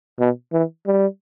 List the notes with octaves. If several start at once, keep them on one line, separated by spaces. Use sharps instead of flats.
B2
E3
G3